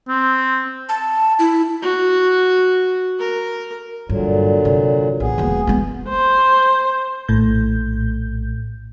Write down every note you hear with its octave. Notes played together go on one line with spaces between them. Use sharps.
C4
A5
E4
F#4
A#4
G2 A#2 D3 F#3
C3
A#1 B3 G#4
E1 A#3
G#3 B3
C5
A#1 A2 G6